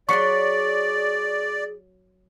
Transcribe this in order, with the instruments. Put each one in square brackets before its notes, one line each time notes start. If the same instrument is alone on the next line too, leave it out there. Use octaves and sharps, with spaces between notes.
[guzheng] F#3 F#5 C6 [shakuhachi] G#4 [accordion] D5 [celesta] C#6 B6 C#7